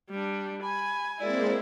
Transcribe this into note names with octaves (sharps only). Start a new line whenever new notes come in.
G3 D4
G#5 B5
G#3 A#3 C4 E4 D5